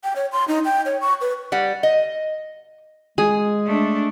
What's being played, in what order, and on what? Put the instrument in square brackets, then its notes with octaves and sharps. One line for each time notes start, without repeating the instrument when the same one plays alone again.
[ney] G5
C#5
C6
D#4
G5
C#5
C#6
B4
[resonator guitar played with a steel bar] G3 F#5
D#5
[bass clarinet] G#3 [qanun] G#4
[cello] A3 D4